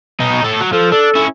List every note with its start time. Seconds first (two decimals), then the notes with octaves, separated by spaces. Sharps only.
0.20 B2 D#4
0.43 A2 A4
0.60 F#3
0.73 F3 A4
0.92 D4 A4
1.15 C#4 E4